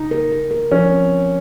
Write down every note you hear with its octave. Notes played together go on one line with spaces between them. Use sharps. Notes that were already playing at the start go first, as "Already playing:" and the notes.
Already playing: C#3 D#4
A#4
A#4
A#4
F3 C#4
C4